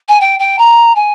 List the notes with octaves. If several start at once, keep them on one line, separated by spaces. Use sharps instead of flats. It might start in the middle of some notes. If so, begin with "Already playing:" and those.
G#5
G5
G5
A#5
G#5